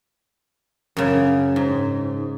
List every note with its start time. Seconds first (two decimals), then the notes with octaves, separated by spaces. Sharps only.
0.97 F#2 C#3 D5
1.56 G#2